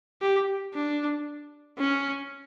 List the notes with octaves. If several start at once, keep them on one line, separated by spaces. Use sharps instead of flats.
G4
D4
C#4